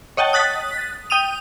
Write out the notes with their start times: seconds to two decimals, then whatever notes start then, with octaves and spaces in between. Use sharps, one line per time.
0.17 C#5 D#5 F#5 G5 A5
0.33 D#6 F#6 A6 B6
1.10 G5 D#6 D#7 F7